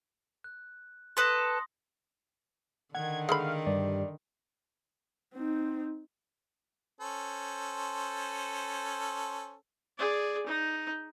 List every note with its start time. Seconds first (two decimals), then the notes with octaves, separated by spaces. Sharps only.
0.44 F#6
1.17 A4 B4 C6 D#6 A#6
2.95 D3 D#3 F#5 G#6
3.29 G#3 A3 F5 B5
3.66 G2 D5
5.34 C4 D#4
7.01 C#4 A4 C5
9.98 G#4 D5
10.46 D#4